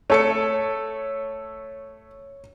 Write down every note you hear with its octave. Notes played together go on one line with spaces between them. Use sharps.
A3 A4 C#5 C#7